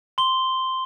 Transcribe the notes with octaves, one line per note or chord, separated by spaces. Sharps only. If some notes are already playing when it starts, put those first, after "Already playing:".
C6 G7